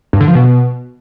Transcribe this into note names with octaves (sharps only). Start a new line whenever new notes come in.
G2
D3
F3
B2